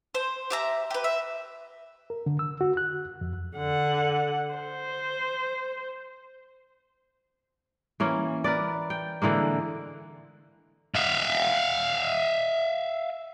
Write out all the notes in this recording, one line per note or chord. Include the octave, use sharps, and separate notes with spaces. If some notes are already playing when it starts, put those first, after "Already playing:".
C5
G4 E5 A#5
G4 B4
E5
A#4
D3
E6
F#4
F#6
F2
D3 F#5
C5
E3 A#3 C#4
A#4 B4 D5
G5
D3 E3 G#3 A#3
E5 F5